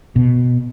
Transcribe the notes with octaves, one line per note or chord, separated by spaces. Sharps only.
B2